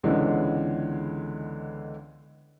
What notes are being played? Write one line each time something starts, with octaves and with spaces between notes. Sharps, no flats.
C#2 D3 E3 G#3 B3 C#4